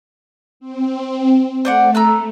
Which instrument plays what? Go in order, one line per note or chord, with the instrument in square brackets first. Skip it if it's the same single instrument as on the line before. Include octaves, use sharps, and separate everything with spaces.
[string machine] C4
[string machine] A3 [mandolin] C5 D5 F#5
[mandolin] A#5 E6 F#6